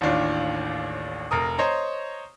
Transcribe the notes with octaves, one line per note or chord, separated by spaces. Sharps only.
A1 D#2 A2 D4 F4
F1 A#4 D#6
C5 C#5 D#5 A#5